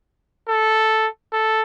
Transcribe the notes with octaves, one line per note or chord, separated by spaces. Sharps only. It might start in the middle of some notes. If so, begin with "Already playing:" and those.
A4
A4